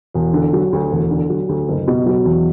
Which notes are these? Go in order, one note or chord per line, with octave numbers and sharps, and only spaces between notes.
E1
D3
F#3
D2
E1
D3
F#3
D2
F#1
B2
F#3
E2